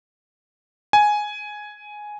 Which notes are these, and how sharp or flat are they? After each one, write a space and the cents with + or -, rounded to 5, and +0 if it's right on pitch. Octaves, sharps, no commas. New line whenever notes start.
G#5 +5